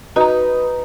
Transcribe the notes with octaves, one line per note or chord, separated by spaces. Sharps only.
D#4 F#4 B4 A#5